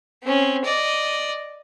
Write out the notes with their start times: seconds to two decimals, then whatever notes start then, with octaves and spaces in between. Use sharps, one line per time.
0.23 C4 C#4
0.64 D5 D#5